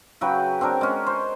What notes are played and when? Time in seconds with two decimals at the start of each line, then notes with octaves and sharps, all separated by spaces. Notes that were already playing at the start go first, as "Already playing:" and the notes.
0.21 C#3 F#3 B4 G5
0.61 C4 D4 A#4
0.81 G#3 C#4
1.07 C5